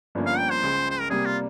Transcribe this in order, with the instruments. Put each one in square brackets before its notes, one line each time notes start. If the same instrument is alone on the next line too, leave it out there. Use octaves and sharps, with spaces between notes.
[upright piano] G1 G2 F3 A#3 C#4
[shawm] F5
G5
C5
[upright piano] C#2 C#3 G#3
[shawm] C5
A#4
[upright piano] C3 G3 A#3 [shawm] G#4
[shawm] F4